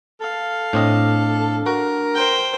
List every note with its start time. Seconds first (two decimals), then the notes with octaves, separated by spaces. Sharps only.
0.21 A4 F5
0.73 A2 C4 D4 D#5
1.66 F#4 A#4
2.15 C5 G5